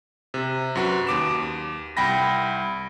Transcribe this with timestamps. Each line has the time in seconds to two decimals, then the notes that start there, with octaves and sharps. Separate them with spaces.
0.34 C3
0.75 F#2 F#4 B4
1.07 D#2 D6 E7
1.97 C2 G5 B5 A#6